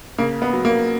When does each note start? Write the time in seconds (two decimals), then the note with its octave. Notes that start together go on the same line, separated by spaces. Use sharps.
0.18 C#3 A#3
0.42 B3
0.53 F#3
0.65 A#3